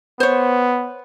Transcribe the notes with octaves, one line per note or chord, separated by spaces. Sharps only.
B3 C5 C#5